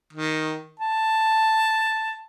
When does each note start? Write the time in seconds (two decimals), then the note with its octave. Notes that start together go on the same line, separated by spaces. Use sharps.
0.13 D#3
0.80 A5